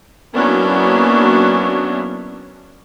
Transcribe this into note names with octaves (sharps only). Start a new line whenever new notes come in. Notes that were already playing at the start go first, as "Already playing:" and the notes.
F#3 A#3 B3 C#4 D4 E4